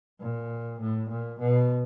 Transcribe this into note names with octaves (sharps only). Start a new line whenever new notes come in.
A#2
A2
A#2
B2